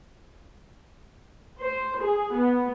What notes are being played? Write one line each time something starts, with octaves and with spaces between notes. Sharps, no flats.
C5
G#4
B3